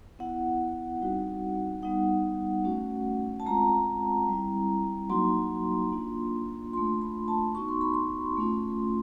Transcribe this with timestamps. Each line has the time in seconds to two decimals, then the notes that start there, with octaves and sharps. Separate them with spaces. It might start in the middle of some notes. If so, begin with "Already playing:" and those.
0.19 B3 E4 F#5
1.01 G3 C4 D#4 F#4
1.82 G3 B3 D#4 F#5
2.64 A3 C#4 F#4
3.40 A5
3.46 G#3 C4 F4 A#5
4.29 G3 C4 E4
5.10 F#3 A#3 D#4 F#4 C6
5.92 A#3 D4 F4
6.73 A3 D4 F4 C6
7.02 B5
7.28 A5
7.55 B3 D#4 F#4 C#6
7.69 C6
7.81 B5
7.94 C6
8.37 A3 C#4 F4